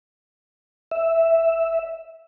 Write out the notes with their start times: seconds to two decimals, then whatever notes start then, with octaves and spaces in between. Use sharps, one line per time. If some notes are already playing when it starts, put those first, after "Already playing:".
0.91 E5